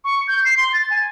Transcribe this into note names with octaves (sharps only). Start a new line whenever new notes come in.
C#6
G6
C7
C6
A6
G#5